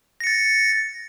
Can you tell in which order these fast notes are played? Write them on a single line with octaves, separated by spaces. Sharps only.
A#6 C#7 A6